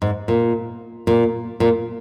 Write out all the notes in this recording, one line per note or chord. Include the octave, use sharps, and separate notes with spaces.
G#2
A#2
A#2
A#2